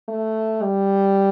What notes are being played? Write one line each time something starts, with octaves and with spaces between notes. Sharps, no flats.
A3
G3